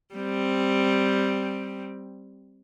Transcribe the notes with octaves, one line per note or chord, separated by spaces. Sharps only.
G3 C4